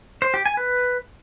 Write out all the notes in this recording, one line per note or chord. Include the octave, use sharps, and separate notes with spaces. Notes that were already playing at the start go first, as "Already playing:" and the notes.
C5
G4
G#5
B4